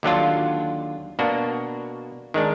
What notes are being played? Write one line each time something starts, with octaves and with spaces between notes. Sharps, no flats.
D#2 D3 F#3 D4 F4
B2 A#3 D4 F#4
D#3 G#3 D4